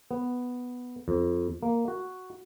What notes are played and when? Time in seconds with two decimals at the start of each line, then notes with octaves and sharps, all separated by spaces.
0.11 B3
1.08 F2
1.63 A#3
1.88 F#4